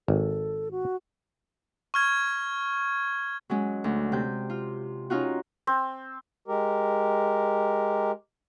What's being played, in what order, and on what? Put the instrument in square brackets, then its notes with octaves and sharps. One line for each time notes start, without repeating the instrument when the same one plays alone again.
[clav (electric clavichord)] G#1 [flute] A4
[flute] F#4
[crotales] C#6 F6 G#6
[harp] F#3 G#3 C#4
D2
C3 G6
F4
C#4 D#4 F4 F#4
[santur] C4
[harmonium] G#3 G4 A#4